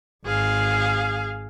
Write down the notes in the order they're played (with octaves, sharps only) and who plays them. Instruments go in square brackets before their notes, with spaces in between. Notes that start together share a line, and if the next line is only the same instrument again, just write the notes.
[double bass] G#1 [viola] G#4 F5